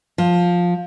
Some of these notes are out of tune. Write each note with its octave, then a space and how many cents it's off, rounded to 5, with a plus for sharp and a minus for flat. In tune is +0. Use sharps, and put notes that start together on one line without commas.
F3 +10